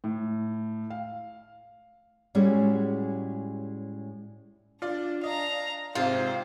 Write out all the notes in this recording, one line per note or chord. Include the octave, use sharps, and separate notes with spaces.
A2
F5
A2 G3 G#3 C#4 F#4 G#4
D4 F4 D5
D4 D#5 F5 A#5
G#2 C3 C4 F4 C5